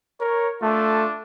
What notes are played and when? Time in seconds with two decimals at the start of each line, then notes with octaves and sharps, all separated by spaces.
0.20 A#4 C#5
0.62 A3 D4 F4 A4